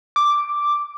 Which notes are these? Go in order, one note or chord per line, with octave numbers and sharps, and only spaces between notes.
D6